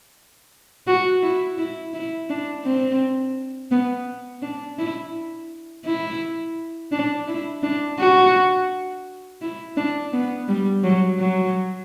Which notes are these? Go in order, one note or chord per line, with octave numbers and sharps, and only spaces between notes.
F#4
E4
E4
E4
D4
C4
B3
D4
E4
E4
D4
E4
D4
F#4
E4
D4
B3
G3
F#3
F#3